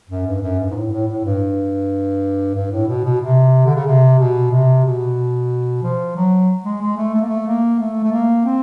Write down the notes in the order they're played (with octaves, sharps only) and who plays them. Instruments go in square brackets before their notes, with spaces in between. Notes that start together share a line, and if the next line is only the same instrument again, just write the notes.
[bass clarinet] F#2
G2
F#2
G2
G#2
A2
A2
A2
G2
G2
A2
B2
B2
C3
D3
C#3
C3
B2
C3
B2
F3
F#3
G#3
G#3
A3
A3
A#3
A3
A#3
A3
A3
A#3
C4